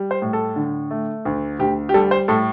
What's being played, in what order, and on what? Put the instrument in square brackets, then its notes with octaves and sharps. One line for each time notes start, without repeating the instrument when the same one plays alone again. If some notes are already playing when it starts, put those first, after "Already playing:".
Already playing: [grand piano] G3
C5
A2
A4
D3
A3
D2
D2 G4
G4
G3 A4
C5
A2 A4